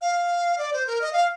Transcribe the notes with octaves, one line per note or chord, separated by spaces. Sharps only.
F5
D5
C5
A#4
D#5
F5